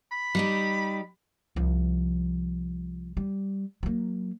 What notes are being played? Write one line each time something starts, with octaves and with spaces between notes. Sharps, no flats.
B5
G3 D#4 G4
C2 F3
G3
F#3 A#3